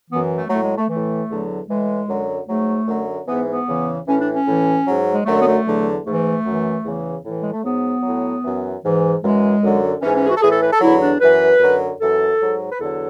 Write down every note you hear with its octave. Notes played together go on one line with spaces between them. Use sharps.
F#2 E3 B3
A3
A2 F#3 A3
G#3
A3
A2 E3 A3
E2 D3 F#3
A2 E3 G#3
F#2 D3 F#3
G#2 F#3 A3
F#2 D3 F#3
G#2 E3 B3
B3
E2 C#3 E3
A2 E3 C#4
D4
C#4
A2 E3
G#2 F#3
G#3
F#2 D3 F#3 A3
B3
A3
E2 D3 F#3
G#2 E3 A3
F#2 E3
E2 C#3 E3
A2 E3
G#3
A3
G#2 F#3 B3
A2 F#3
F#2 E3
G#2 E3
F#2 E3 G#3
F#2 D3 F#3
G#2 E3 C#4
C#4
G#4
F#4
A4
A2 E3 G#4
A4
B4
A4
E2 D3 F#3 E4
D4
F#2 E3 B4
F#2 D3 F#3
F#2 E3 A4
G#2 F#3
B4
E2 D3 F#3 A4